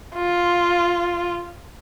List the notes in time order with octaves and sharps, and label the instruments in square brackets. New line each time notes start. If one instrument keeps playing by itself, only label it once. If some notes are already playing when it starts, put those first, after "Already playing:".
[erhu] F4